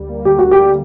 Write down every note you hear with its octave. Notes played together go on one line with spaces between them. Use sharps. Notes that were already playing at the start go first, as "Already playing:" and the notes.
Already playing: D2 G3
A#3
D3 G4
D2 F#4
G4
G3